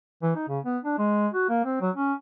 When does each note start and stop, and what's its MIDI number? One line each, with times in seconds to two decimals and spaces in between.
0.23 0.32 52
0.35 0.46 63
0.48 0.59 49
0.64 0.78 59
0.84 0.96 62
0.98 1.27 56
1.33 1.46 66
1.49 1.64 58
1.65 1.79 60
1.81 1.90 54
1.96 2.13 61